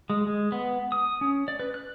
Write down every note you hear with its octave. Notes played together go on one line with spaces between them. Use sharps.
G#3
G#3
B3
D#6
C#4
D5
B4
F#6